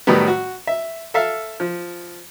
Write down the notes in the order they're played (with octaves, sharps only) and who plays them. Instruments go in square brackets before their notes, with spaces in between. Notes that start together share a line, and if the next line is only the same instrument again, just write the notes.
[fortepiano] A2 D#3 F#3 G3 B3
F#4
E5
A4 E5 F5
F3